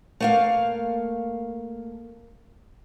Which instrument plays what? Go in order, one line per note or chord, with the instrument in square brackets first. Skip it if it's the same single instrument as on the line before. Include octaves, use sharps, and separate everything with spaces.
[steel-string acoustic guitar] A3 A#3 F5